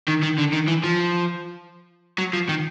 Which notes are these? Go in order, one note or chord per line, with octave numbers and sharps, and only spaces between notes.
D#3
D#3
D3
D#3
E3
F3
F#3
F3
D#3